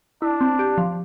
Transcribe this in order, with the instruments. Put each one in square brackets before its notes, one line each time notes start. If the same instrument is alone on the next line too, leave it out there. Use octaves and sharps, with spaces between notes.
[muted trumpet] D4 [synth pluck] E4
[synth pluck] C4
G4
F3